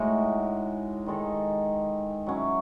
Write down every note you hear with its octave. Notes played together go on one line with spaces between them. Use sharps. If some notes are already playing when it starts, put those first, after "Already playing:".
Already playing: A2 G#3 D#4 F#4
D#3 G#3 D#4 A4
F#3 C#4 E4